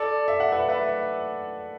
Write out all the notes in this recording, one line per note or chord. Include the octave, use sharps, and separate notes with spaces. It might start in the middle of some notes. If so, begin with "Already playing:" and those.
Already playing: A4 D5
E5
F#5
B4 E5
B4 E5